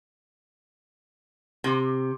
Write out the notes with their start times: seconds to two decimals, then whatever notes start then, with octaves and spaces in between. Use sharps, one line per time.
1.64 C3